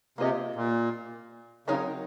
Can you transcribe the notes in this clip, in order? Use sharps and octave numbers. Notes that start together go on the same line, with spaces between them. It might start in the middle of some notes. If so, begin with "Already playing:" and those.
C3 A#3 F4 G#4 C5 D#5
A#2
C#3 F#3 C4 D#4 A#4 C#5